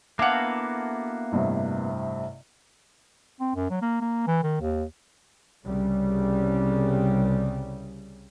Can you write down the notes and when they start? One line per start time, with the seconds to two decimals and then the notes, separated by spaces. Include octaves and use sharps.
0.19 A#3 B3 D4 E4 F#4 A4 F5
1.32 A1 G2 C3
3.40 C4
3.55 F#2
3.70 F#3
3.82 A#3
4.01 A#3
4.27 E3
4.43 D#3
4.61 D#2
5.66 C2 C#3 G3